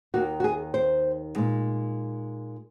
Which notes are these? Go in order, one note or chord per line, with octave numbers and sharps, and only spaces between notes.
D#2 D#3 A#3 F#4
F#4
G#4
C5
A#2 G#3 D#4